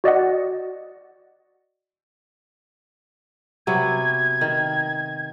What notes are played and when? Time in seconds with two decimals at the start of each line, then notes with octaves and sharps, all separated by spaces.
0.04 F#4 D5 D#5 F#5
3.67 C3 F#3 B3 G#6
4.41 D#3